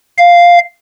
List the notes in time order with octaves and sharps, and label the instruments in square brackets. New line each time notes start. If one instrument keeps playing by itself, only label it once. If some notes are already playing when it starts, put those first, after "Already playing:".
[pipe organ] F5